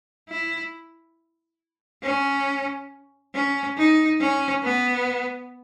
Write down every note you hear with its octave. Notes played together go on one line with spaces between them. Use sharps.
E4
C#4
C#4
D#4
C#4
B3